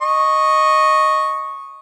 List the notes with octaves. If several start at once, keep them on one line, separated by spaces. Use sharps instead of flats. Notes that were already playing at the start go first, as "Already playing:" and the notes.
D#5 C#6